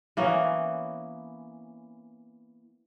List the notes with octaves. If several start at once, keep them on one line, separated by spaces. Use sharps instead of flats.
E3 A#3 B3 C#4